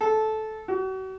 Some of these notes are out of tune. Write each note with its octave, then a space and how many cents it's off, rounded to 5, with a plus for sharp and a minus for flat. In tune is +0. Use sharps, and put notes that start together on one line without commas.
A4 -15
F#4 +40